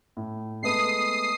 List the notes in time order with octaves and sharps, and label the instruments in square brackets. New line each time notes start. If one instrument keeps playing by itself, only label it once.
[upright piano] A2
[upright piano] G#3 A3 B3 [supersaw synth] D#6 C7